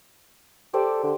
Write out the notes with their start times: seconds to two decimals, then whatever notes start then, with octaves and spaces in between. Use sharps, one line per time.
0.74 G4 A4 C5 D5
1.03 D3